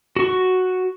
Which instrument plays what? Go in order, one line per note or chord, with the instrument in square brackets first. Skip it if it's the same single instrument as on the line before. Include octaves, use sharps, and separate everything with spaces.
[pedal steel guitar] F#4 C#6